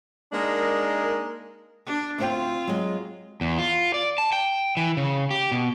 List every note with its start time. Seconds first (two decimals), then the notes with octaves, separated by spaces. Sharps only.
0.32 G#3 A#3 D4 D#4 A#4 D#5
1.86 D4
2.18 D2 C4 F4 C5 G5
2.67 F#3 G#3
3.41 E2
3.58 F4
3.94 D5
4.18 A5
4.32 G5
4.77 E3
4.97 C#3
5.31 G4
5.52 B2